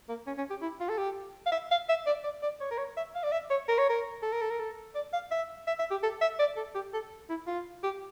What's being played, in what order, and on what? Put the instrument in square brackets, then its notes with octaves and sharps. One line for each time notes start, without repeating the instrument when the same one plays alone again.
[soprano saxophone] A#3
C#4
C#4
G4
E4
F4
A4
G4
F5
E5
F5
E5
D5
D5
D5
C#5
A#4
C#5
E5
F5
D5
E5
C#5
A#4
C#5
A#4
A4
A#4
A4
A#4
A4
D5
F5
E5
E5
E5
G4
A4
E5
D5
A4
G4
A4
E4
F4
G4